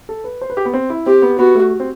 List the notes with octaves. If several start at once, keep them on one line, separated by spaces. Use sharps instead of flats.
A4
B4
C5
B4
G4
B3
C4
E4
C4 G4
B3
B3 F#4
A3
C4